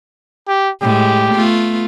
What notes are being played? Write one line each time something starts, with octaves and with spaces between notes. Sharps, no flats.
G4
A2 G#3 G4
A3 B3 F4